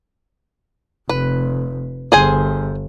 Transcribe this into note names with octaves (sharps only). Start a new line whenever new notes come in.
F1 B4
G1 G#4 C5 G#5